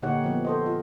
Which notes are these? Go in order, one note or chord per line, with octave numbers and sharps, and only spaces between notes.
A#2 D3 D#4 G4 C#5 F#5
F3 B3
A4 C5 D#5
F4